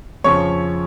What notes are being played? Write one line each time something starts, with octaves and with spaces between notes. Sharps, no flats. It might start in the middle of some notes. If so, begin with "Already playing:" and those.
F2 C#3 F3 C#5 C#6